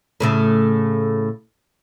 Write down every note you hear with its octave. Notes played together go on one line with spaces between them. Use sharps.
A2 C#3 A3